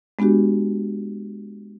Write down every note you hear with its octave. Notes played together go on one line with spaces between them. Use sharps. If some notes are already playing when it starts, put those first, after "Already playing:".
G#3 B3 D4 F#4 G4